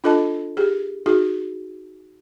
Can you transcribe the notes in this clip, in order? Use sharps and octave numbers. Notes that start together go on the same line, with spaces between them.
D4 F4 A4 D#5 A5
G4 G#4
D#4 F#4 G#4